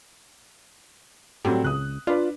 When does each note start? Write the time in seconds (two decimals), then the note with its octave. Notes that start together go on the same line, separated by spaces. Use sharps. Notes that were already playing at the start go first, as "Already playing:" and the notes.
1.45 A2 F#3 G3 C4
1.64 C#2 D#6 F#6
2.07 D4 F4 B4 D5